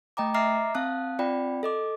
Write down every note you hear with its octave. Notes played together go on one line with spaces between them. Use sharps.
A3 D#5 G5 A#5 D6
D#5 E5 A#5 D6 F6 C7
C4 F5 A5 D#6 F#6
C4 F4 D5 G5 B5
A4 D#5 D6